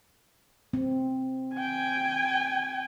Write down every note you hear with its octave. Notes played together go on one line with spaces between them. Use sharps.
C4
G5 G#5